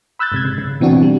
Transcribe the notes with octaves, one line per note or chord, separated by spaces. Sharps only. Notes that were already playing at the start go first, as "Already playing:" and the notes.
B5 E6 F#6 G6 A6
G#2 C3 G#6
C#3
C#3
B2 E3 C4 D4 F#4
G3